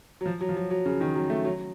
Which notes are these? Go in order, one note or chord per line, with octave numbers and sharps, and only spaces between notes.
F#3
F3
F#3
F3
F#3
F#3
C#3
D#3
F#3
A3
F#3